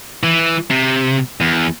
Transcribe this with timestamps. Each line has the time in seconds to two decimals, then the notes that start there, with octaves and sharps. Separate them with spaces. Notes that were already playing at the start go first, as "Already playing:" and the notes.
0.23 E3
0.71 C3
1.41 E2